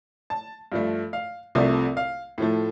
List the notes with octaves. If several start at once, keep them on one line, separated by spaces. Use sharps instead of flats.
A5
G2 F3 A3
F5
C2 C3 F3 A3
F5
A2 F3 A3